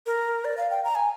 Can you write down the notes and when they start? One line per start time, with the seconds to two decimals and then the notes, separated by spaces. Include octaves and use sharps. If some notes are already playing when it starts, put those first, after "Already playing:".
0.06 A#4
0.45 D5
0.57 F5
0.70 G5
0.84 A#5
0.95 G#5